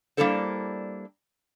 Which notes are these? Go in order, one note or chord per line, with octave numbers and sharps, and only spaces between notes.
G3 A#3 D4 E4 A4 C5